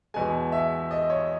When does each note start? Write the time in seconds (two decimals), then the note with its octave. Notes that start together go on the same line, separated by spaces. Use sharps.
0.14 E2 B2 G#3 G#5
0.52 E5
0.91 D#5
1.10 C#5